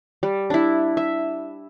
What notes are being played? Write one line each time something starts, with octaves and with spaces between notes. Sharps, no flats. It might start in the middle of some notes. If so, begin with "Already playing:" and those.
G3
D4 E4
E5